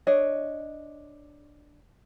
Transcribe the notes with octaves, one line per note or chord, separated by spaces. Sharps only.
D4 C#5 D#5